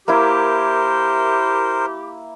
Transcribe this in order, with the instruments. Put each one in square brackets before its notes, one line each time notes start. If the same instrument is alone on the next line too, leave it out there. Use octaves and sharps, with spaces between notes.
[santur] A#3 E4 [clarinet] G4 [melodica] A#4 C5